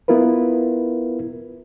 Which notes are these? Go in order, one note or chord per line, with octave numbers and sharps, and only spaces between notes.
B3 E4 F4 A#4 B4